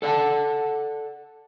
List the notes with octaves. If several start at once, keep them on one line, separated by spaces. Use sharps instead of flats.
A4 D5 D#5 F#5 A5